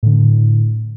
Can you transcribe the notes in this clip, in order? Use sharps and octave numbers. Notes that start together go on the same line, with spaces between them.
A2 D3